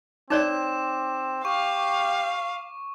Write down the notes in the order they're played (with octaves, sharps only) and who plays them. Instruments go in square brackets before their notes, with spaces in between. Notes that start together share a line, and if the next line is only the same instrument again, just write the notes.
[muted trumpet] C4 [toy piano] D#4 C#5 D5 [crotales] D6 E7
[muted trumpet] G4 [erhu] F5 [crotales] C#6